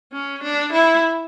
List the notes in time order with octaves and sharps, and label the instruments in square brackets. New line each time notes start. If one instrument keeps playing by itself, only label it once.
[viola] C#4
D4
E4